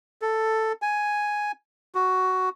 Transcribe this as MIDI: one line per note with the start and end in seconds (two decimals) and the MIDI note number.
0.22 0.73 69
0.82 1.52 80
1.95 2.49 66